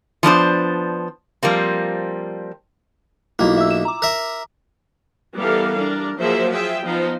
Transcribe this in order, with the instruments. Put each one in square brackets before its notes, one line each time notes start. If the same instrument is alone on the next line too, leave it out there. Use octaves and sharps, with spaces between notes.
[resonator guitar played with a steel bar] F3 B3 D4 C5
F3 G3 A#3 C4
[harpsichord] B1 A#3 [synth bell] E4 F4
[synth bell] E5 E6
E7
A#5 D6
[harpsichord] A#4 E5
[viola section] E3 G3 B3 A4 A#4 F5
G3 D4 A#4
F3 F#3 A#3 G#4 C5 E5
F4 G#4 E5 G5
F3 B3 D#4 F4 C5